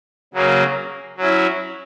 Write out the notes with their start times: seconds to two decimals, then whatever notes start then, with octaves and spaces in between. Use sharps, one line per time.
0.34 C#3 F#3 A#3 C#4
1.17 F#3 C#4 E4